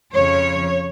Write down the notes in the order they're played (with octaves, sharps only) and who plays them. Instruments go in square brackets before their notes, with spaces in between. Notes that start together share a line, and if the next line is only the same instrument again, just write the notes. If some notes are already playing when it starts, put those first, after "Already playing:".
[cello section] F2 C#3 F3 C#5